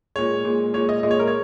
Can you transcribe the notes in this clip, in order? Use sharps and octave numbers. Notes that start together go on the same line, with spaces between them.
A#2 G#3 C#5
A#2 G#3
A#2 G#3 C#5
D#5
A#2 G#3 D#5
C#5
A#4
C#5